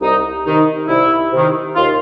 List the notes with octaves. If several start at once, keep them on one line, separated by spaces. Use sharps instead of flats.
C2 D#4
C3 D#3 D#4
C2 E4
C3 D#3
D#2 F4